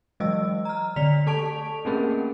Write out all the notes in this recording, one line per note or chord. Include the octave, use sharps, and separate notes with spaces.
E3 F#3 G#3 D#5 E6
A#5 F6
D3 D5 B6 F7
A3 A4 A5 C#6 D7 F7
A3 A#3 C4 C#4 G#4 A#4